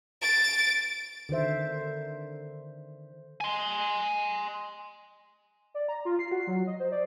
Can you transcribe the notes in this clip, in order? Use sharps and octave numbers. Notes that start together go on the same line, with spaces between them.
A6 D7
D3 D#3 C5 E5
G#5 C6
D5
A#5
F4
C7
F#4
F#3
D#5
C5
D5